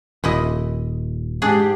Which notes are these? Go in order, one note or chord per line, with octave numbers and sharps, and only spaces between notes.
D#1 A#2 E4 D#5
G#2 D4 G4 G#4